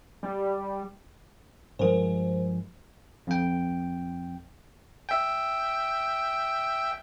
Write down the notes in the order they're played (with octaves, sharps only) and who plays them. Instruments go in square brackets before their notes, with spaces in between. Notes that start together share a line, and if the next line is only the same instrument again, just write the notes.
[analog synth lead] G3
[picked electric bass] G2 F3 G#3 [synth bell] A#4 C5
[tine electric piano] F2 G5
[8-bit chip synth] E5 G5